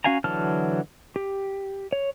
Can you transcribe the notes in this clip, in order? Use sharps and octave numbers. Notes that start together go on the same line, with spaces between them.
C#4 F#4 F5 G#5 A#5
D3 E3 F#3 A5 F6
G4
C#5